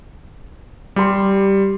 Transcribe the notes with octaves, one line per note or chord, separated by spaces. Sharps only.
G3 G4 C6